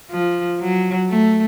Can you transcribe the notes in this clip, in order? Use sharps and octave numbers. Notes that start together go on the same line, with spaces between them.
F3
F#3
A3